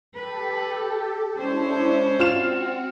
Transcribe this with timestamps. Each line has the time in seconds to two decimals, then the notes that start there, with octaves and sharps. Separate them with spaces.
0.15 G4 A4 B4
1.37 G#3 C#4 D4 E4 C5
2.19 C4 F4 F#4 F6 E7